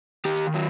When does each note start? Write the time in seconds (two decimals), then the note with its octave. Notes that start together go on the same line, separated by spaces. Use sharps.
0.25 D#3 G4
0.54 F#3